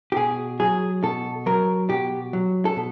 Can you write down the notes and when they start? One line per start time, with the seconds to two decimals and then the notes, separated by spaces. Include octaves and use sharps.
0.12 G4
0.16 B2 G#4
0.60 F#3 G#4
1.03 B2 A4
1.46 F#3 A#4
1.90 B2 G4
2.33 F#3
2.65 A4
2.76 B2